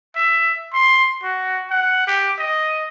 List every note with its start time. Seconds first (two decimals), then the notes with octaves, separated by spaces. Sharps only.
0.16 E5
0.74 C6
1.23 F#4
1.70 F#5
2.07 G4
2.39 D#5